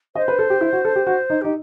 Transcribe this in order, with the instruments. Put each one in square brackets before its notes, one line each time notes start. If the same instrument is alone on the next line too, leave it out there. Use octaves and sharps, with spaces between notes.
[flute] C5 [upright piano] D#5
[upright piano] B4
A4
G4
E4
F#4
A4
G4
F#4
D#4
[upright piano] D#4 [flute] G4